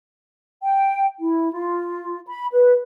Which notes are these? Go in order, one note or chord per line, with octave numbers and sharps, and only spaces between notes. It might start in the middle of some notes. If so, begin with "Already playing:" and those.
G5
E4
F4
B5
B4